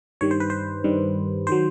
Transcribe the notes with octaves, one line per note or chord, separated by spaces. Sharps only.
G2 D#3 G3 C#5
C5
B4
C5
G2 D#3 G3
D#3 F#3 C5